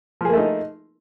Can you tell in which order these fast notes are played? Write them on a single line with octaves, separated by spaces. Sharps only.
F3 G#4 A#3 A3 D#4